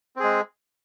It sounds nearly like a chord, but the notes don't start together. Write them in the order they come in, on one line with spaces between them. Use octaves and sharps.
C4 G#4 G#3